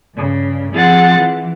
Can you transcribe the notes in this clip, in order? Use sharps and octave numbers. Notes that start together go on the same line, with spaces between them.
G2 C#3
F3 C4 F4 G#4 F#5 A6
E3